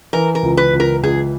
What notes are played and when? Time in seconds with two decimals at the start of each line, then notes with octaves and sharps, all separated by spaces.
0.13 E3 A#4
0.35 A#4
0.43 C#2
0.57 B4
0.73 C#2
0.80 A#4
1.03 C#2 G#4